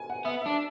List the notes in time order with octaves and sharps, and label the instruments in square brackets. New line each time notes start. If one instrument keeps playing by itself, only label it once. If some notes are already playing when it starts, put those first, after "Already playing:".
Already playing: [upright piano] G#5
F#5
[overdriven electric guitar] B3 [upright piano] E5
[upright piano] E5
[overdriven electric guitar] D4